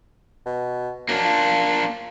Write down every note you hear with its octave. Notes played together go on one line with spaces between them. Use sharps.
B2
F#2 A#3 D4
F4